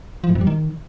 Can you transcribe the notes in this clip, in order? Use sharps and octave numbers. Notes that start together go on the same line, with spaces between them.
F3
A2
F2
G3
D#3